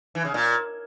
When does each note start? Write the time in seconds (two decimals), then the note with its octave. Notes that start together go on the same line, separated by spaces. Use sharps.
0.15 E3
0.25 C#3
0.34 A#2